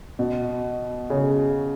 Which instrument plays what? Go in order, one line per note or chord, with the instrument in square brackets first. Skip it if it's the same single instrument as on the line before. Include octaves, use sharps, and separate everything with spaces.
[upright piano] B2
C#3